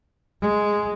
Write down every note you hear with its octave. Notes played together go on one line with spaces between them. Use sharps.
G#3